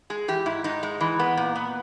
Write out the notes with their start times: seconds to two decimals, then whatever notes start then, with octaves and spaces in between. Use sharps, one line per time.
0.10 G#3 G#4
0.28 E3 G4
0.46 G#2 E4
0.64 G#2 D#4
0.83 G#3
1.00 E3
1.20 B3
1.37 A#2
1.55 B3